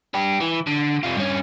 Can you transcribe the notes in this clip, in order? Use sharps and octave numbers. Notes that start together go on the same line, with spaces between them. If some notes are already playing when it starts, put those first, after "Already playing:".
D4 G4
E3
D3
C3 F4
G2 C#4